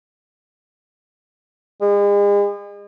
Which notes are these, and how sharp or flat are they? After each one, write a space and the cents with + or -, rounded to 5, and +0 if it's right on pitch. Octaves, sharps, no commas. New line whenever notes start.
G#3 -40